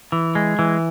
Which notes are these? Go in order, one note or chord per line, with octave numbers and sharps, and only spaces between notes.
E3
G#3
E3